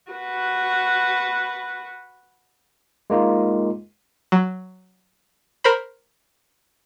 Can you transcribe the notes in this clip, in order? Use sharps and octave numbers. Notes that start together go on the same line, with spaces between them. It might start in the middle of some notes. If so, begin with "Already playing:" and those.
F#4 B4
G#3 A#3 D#4 F4
F#3
A#4 C5 B5